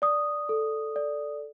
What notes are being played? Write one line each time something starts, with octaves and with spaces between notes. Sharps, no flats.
D5 D#6
A4
D5